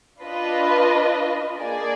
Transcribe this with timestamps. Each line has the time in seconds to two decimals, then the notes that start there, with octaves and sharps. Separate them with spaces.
0.23 D4 F4 B4 D#5
1.57 A#3 D4 G#4 D5 G#5